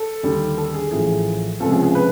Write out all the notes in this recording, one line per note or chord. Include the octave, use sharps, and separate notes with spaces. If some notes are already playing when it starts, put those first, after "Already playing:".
Already playing: A4
D#2 D3 G3
A4
G#4
A1 A2 F3 G#4
C#2 C3 F3 A3 C#4 A4
G#4
G#4
B4